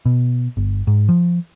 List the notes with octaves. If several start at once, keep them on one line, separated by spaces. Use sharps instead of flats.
B2
G1
G#2
F3